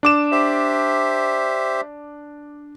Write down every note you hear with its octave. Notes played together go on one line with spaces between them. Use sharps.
D4 D6 E7
G4 C5 E5